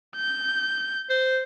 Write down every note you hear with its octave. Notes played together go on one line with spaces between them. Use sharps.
G6
C5